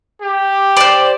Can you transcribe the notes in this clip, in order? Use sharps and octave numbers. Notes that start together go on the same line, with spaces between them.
G4
C5 D5